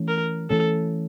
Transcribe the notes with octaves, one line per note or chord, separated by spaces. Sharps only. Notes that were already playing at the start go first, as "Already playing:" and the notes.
Already playing: E3 A3 C#4
A#4
E3 A3 C#4 A4